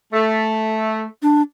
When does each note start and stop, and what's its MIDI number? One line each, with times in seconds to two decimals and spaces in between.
0.13 1.04 57
1.22 1.42 62